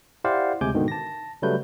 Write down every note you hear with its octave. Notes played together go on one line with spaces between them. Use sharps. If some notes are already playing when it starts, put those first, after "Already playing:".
E4 G4 C5 D5 F5 F#5
D2 C3 G#3 G#5 D6 G6
G#2 B2 D3 D#3
A5 A#6
C#3 F#3 G3 A3 B4 G6